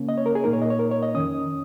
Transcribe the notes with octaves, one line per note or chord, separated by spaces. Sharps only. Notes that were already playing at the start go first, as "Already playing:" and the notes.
Already playing: C#3 A#3 C#4
D#5
C#5
A#4
G#4
A#2 A#3 D#4 A#4
C#5
D#5
C#5
A#4
C#5
D#5
F2 D#3 C#4 D#6